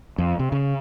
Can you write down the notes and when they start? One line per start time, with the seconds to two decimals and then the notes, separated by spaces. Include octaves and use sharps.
0.18 F2
0.39 C3
0.52 C#3